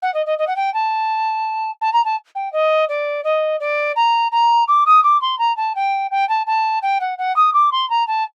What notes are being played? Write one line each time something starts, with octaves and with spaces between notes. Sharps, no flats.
F#5
D#5
D#5
D#5
F#5
G5
A5
A5
A#5
A5
G5
D#5
D5
D#5
D5
A#5
A#5
D6
D#6
D6
C6
A#5
A5
G5
G5
A5
A5
G5
F#5
F#5
D#6
D6
C6
A#5
A5